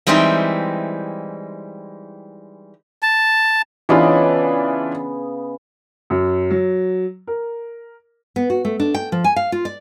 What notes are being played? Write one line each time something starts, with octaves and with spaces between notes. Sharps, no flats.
E3 G3 G#3 C4 D#4 E4
A5
C#3 E3 B3 D4 F4 D#5
F#2
F#3
A#4
B3
F#4
A3
D4
G5
F3
G#5
F5
F4
D5